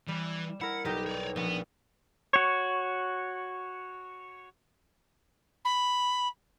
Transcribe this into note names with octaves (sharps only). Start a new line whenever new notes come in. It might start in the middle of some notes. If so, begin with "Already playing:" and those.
E3 G3
E4 A#4 F#5
B1 D#4 G4 G5
C#5 D5
A#1 B3
F#4 C#5
B5